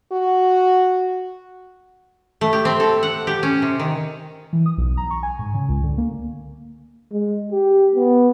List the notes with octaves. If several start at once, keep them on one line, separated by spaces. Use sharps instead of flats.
F#4
A3
G4
C4
A4
F#5
G4
C#4
C3
D#3
E3
D#6
B1
A#5
C#6
G#5
G#2
C#3
C#2
D3
A#3
G#3
G4
B3